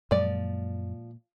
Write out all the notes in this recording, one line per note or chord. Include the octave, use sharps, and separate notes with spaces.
F#2 A#2 F3 G#3 A#3 D5